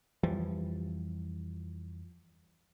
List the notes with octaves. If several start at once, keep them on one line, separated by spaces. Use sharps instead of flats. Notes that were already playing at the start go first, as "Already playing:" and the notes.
F2 E3 F3 G3